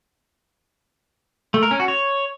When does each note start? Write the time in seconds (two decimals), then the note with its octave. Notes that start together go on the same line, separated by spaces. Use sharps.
1.54 A3
1.63 A#4
1.71 C#4
1.80 F#4
1.88 C#5